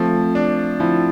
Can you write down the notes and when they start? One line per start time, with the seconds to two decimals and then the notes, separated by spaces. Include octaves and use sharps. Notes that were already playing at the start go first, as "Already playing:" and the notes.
Already playing: F3 A3 C4
0.35 D4
0.80 F3 C4 E4